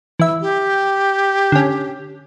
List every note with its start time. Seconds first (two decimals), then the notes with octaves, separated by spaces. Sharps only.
0.19 E3 E5
0.42 G4
1.52 D3 C#4